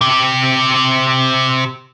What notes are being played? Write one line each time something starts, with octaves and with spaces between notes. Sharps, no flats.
C3 G4